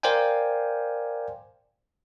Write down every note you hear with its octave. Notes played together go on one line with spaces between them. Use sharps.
A#4 C5 D5 F5 G5 G#5